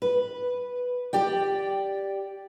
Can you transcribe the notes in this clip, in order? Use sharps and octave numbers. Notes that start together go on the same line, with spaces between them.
B4
G4 D5 G5